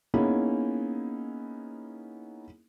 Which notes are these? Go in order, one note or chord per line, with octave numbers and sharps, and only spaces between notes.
A#3 B3 C#4 D#4 E4 G#4